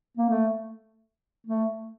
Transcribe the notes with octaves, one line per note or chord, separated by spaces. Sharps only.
A#3
A3
A3